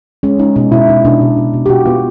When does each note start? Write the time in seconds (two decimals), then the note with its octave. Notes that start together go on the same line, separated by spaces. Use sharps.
0.23 G#3 C#4
0.39 G#3 D#4
0.56 B2 D#4
0.72 B2 E4
0.89 B2 D#4
1.05 B2 D4
1.21 B2
1.37 B2
1.53 B2
1.66 G4
1.69 B2 F#4
1.86 B3 F4